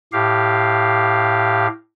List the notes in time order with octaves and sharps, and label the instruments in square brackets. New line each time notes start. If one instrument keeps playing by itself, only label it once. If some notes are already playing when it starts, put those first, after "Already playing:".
[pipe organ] A2 G4 F5